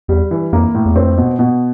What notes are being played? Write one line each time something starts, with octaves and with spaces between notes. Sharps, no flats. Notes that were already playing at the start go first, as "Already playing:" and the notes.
E2 G3
E3
F2 A#3
A2
E2
F2 C4
B2
B2